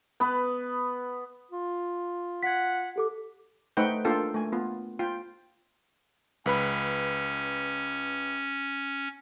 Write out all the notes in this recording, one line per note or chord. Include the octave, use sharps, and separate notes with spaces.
B3 B4
F4
F#5 G#6 B6
G4 A4 D6
A3 D#4 B4 C5 F#5 G5
A#3 D4 F4 A4 F5 G5
A3 G#5
B3 F4
F4 G5
C#2 C#4 B4 B5